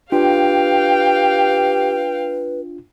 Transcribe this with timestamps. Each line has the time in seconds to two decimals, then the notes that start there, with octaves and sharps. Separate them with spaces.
0.12 D4 F4 G4 B4 F5 G5